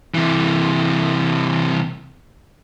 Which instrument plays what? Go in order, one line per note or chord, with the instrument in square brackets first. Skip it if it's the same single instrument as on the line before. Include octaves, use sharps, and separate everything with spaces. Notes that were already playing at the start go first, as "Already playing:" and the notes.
[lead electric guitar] C3 E3